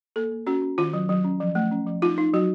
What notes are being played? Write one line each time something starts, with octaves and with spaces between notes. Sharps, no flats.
A#3 A4
A#3
C#4 F#4
C#4
D#3 F4
F#3
F#3
C#4
F3
A3
C#4
F3
D#4 F4
D#4
F#3 F#4